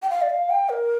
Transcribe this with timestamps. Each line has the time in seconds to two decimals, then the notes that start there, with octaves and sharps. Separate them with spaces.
0.02 G5
0.10 F5
0.22 D5
0.30 F5
0.50 G5
0.69 A#4